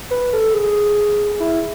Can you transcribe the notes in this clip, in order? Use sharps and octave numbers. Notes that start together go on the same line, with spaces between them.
B4
A4
G#4
E4